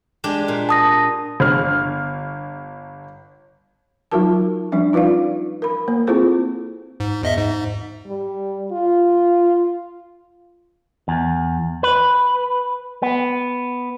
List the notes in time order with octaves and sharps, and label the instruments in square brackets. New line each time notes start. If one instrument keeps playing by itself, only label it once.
[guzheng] G#3 D4 G4
A#2
[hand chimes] A5 D#6 A#6
[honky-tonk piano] G1 F6
[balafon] F#3 D#4 F4 F#4 A#4 A5
F3 G3 C#4 D4 E5
D#4 F4 B4 D5 F5
A#4 B5
A#3
C4 E4 F4 G#4 A4 C5
[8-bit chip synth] G#2
E2 D#5 E5
G#2
[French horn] G3
F4
[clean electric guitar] E2
B4
B3